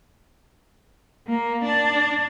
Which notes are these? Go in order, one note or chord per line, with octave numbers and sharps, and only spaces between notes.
A#3
D4